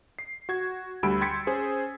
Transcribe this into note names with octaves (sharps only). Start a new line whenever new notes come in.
C7
F#4 G#6
D2 G3 B5 E6 D7
G5 C6 G#6 A6 B6 C#7
C#4 G#4 C5 G#5